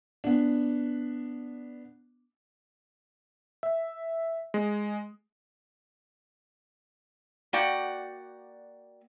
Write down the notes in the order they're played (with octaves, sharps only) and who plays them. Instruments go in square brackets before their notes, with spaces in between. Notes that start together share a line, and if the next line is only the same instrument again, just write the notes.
[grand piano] B3 D4
[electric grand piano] E5
G#3
[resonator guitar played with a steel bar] A#3 F#4 D5 F#5 G5